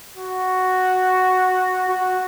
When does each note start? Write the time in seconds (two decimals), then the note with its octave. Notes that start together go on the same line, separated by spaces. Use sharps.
0.16 F#4
1.89 F#4